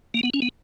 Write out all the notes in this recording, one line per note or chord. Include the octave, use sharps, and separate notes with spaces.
A#3
B3
C#4
B3